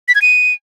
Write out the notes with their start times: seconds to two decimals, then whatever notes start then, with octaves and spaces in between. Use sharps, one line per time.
0.08 B6
0.15 G#6
0.22 D#7